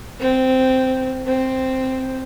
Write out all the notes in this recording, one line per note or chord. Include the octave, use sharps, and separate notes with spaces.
C4
C4